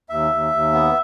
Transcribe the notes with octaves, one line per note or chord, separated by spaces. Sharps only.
D#2 E5
D#2
D#2
B3